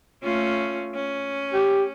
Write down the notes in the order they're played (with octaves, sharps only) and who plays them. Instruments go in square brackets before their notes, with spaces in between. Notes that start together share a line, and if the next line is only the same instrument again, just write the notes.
[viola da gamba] A3 C#4 F4
C#4
[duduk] G4